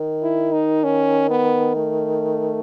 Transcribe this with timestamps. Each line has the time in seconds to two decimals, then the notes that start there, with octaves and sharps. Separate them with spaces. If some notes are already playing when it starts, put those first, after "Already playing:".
Already playing: D#3
0.22 E4
0.53 D#4
0.84 C#4
1.30 B3
1.76 A3